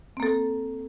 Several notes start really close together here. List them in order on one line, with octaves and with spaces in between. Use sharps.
C4 A#3 A4